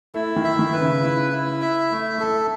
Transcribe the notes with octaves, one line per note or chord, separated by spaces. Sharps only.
A3 E4
D#3
E5
D#3
B4
C#3
E4
E4
E5
A3
A4